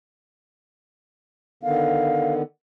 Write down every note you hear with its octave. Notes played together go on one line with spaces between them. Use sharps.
D3 D#3 B3 F5